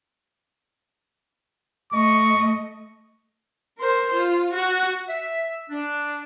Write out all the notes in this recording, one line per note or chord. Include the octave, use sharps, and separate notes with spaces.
A3 D#5 C#6
A#4 C5
F4
F#4
E5
D4